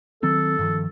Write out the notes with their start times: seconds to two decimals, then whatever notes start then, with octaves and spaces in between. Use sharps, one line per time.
0.23 D#3 F#3 C4 A4
0.59 G2 D#3 F3